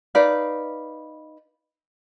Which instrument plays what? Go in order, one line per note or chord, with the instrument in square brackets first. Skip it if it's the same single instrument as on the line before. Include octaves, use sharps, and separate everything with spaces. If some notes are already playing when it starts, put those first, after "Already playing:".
[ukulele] D#4 B4 D5 F5